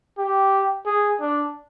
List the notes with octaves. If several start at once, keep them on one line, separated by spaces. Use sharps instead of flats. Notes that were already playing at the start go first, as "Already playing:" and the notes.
G4
G#4
D4